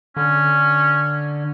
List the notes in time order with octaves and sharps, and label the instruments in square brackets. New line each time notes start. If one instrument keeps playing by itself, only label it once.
[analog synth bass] D3 [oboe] C#4